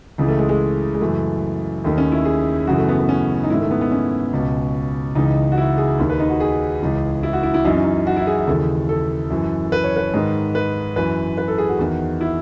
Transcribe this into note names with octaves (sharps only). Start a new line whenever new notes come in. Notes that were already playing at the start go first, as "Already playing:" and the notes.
C#2 C#3 E3
A3
G#3
G#3
G#3
F#2 C#3 E3 A3
D#2 D#3 A3
C#4
E4
G#4
F#2 C#3 E3 F#4
A3
B3
B3
C#4
D#4
G#2 D#3 E4
A3
B3
B3
C#4
C#2 B2
C#2 C#3 E3 D#4
F#4
E4
G#4
D#2 D#3
B4
D#4
F#4
G#4
C#2 C#3 E3
E4
F#4
E4
E4
F#2 E3 D#4
C#4
D#4
F#4
E4
G#4
D#2 C#3 E3 A4
A4
F#2 E3
B4
C#5
B4
G#2 D#3
B4
F#2 E3 B4
B4
A4
G#4
F#4
E2 D#3
E4